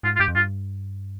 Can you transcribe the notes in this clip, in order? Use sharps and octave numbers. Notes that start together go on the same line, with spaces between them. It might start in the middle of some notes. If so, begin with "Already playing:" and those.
G#2 F4
F4
G2 G4
F2
G2 F4